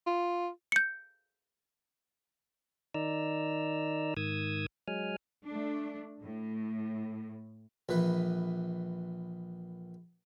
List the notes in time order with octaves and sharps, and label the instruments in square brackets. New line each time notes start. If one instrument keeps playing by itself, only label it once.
[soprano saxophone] F4
[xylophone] G6 C#7
[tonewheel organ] D#3 D#4 D5 A#5 E6
G#2 D#3 D#6 E6 G#6
F#3 G#3 G#5 F6
[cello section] A3 D4
A2
[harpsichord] A#1 E3 B4